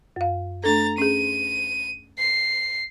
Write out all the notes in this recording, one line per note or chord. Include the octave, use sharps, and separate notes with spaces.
F#2 F5
A3 D4 A4 A#5 A6
C#4 G#4 D#7
C7